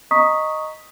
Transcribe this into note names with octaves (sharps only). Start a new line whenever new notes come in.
D#5 A#5 C#6 D#6 B6